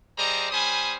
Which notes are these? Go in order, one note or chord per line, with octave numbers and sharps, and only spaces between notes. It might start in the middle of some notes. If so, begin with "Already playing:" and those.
G3 G#4 C5 D5 D#5 A#5
G3 C#4 C5 G#5 B5 D#6